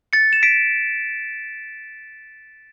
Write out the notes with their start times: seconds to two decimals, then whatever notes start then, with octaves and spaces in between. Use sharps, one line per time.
0.13 A6 C#7
0.33 E7
0.43 B6 D7